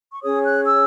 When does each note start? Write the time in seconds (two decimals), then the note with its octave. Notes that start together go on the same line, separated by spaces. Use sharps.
0.12 C#6
0.23 C#4 G#4 C#5 D#6
0.44 F#6
0.66 E6